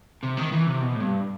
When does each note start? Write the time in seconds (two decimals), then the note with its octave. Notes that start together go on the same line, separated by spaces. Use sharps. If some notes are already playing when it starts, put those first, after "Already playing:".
0.23 C3
0.37 D#3
0.52 E3
0.66 C3
0.81 B2
0.95 A2
1.00 G2